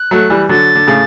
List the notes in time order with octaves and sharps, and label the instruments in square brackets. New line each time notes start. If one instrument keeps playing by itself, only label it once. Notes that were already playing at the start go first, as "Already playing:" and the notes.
Already playing: [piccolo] F#6
[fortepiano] F#3 A3
E3 G3
[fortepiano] D3 F#3 [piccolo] A6
[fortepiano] D3
A2 C#3